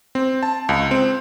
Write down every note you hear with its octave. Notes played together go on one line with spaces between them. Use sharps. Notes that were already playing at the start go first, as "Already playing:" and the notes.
C4
A5
C#2
C4